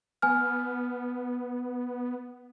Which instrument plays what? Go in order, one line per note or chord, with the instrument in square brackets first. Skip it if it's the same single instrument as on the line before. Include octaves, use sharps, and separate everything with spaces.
[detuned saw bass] B3 [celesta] G#5 F6